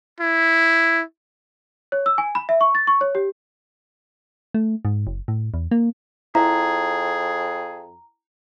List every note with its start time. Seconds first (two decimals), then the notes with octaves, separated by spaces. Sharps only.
0.20 E4
1.92 C#5
2.06 E6
2.18 G#5
2.35 B5
2.49 E5
2.61 C#6
2.75 A6
2.87 C#6
3.01 C#5
3.15 G4
4.54 A3
4.85 G#2
5.07 F#1
5.28 A2
5.54 E2
5.71 A#3
6.35 F2 E4 G#4 A#5